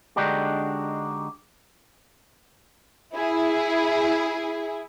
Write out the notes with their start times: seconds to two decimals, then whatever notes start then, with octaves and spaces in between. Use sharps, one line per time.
0.16 D3 G#3 D4 D#4 F#4 G4
3.14 E4 G#4